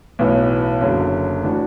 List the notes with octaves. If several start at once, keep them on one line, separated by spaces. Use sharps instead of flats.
B1 A2 E3 B3 F#4
F#1 F#2 D3 F#3
A2 E3 D4 F#4